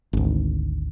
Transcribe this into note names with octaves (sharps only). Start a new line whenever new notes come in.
G#1 D2